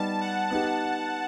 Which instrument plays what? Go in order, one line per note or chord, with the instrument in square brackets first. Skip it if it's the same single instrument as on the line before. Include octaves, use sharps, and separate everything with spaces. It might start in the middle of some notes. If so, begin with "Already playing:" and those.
Already playing: [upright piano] G3 B3 D#4 [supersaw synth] A5
[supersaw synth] F#5
[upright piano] B3 D#4 G4 [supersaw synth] A5